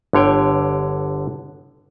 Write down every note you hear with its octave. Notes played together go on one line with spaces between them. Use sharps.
G1 D3 C#5 G5